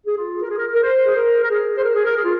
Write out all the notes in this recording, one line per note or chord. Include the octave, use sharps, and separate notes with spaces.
G#4
F4
A#4
G#4
A#4
A#4
C5
G#4
A#4
A#4
G#4
C5
A#4
G#4
A#4
G#4
F4